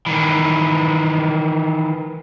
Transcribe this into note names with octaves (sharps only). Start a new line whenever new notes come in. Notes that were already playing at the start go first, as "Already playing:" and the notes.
D#3 E3